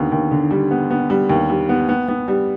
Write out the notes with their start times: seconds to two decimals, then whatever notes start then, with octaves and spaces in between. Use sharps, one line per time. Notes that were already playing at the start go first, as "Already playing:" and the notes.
Already playing: D#2 D3 B3
0.12 D#2
0.31 D3
0.51 G3
0.71 B3
0.91 B3
1.10 G3
1.30 D#2
1.50 G3
1.69 B3
1.89 B3
2.08 B3
2.28 G3